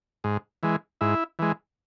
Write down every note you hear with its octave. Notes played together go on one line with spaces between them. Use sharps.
G#2
E3 G#3
G#2 E4
E3 G#3